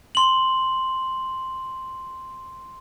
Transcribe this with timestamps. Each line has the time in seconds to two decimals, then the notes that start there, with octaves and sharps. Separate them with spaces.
0.15 C6 F#7